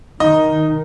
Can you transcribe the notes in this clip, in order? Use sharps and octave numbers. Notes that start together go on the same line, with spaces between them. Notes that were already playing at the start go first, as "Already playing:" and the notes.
D#3 D#4 D#5